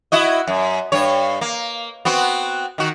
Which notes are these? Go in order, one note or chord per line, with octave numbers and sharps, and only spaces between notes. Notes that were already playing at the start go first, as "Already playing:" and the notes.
E4 F#4 D#5
F#2
G2 C#5
A#3
B3 C4 F#4
D#3 F#4